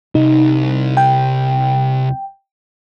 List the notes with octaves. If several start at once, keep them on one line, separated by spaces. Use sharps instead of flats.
C2 D#4
G5